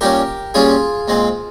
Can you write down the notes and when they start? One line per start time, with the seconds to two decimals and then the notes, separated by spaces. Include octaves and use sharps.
0.01 A#2 G3 C#4 G4 A#4
0.54 A#2 G3 C#4 F4 G#4
1.08 A#2 G#3 C4